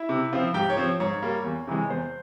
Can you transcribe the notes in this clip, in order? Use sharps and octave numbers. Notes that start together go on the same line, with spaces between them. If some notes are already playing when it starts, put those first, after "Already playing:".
Already playing: E4 E5
C3
F3 C4 F4
G#2 G4 G5
C#5
F3 C4
G#2 C#5
G3 A#3
E2
C3 E3 G#3
E2 C5